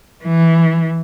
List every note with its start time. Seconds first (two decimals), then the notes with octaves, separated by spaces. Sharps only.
0.24 E3